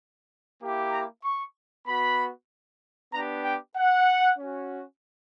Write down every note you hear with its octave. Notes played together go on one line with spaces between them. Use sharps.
A#3 E4 G4
A#5
C#6
B3 F#4 B5
B3 D4 G4 A#5
G5
F#5
C#4 F#4